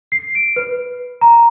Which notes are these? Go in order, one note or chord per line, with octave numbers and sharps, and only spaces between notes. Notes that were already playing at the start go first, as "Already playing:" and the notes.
C7
D7
B4
A#5